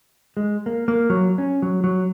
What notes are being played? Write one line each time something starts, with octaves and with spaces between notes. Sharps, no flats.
G#3
A#3
A#3
F#3
C#4
F#3
F#3